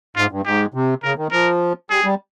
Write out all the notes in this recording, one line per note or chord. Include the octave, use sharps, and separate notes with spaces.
G#2 F4
G2
G#2 G4
C3
C#3 A#4
D#3
F3 A#4
G3 G#4
G3